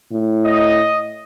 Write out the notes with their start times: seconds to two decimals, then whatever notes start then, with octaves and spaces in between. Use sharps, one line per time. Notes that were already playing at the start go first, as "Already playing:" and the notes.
0.12 A2
0.45 D#5